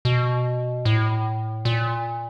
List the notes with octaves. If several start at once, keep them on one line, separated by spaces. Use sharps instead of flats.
B2
A2
A#2